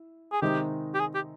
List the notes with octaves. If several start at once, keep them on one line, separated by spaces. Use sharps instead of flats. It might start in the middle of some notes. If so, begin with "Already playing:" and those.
Already playing: E4
G#4
C3 D#3 G#3 C4 D#4 G4
G4
G#4
G4